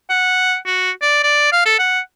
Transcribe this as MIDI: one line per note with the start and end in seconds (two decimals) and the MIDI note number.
0.10 0.56 78
0.66 0.91 66
1.02 1.19 74
1.24 1.51 74
1.52 1.66 77
1.66 1.76 69
1.79 2.00 78